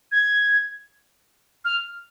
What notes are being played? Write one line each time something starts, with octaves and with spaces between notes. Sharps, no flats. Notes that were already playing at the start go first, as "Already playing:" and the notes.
G#6
F6